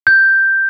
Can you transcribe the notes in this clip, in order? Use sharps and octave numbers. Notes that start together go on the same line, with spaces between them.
G6